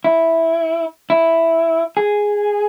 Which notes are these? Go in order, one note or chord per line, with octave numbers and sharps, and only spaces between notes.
E4
E4
G#4